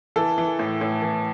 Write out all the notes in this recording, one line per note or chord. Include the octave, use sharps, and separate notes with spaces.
E3 A4
E3
A2
A2
E3